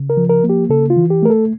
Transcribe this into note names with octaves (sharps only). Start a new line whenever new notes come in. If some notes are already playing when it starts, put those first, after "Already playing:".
Already playing: C#3
A#4
F3
A#4
A#3
G4
C#3 A4
F4
E3
G4
A3 A#4
A4